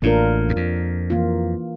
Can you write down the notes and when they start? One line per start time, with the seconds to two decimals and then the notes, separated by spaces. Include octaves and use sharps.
0.02 A1 A2 A#3 D4 F4 A#4
0.49 E2
0.56 F2
1.10 E3 A#3 F4